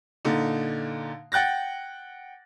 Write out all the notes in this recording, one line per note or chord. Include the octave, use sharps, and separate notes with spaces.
A#2 D3 D#4
F#5 G5 F#6 A6 A#6